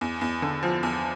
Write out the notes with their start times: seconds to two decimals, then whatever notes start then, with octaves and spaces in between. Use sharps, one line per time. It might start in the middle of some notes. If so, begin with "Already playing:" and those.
0.01 E2
0.21 E2
0.42 D3
0.63 F3
0.83 E2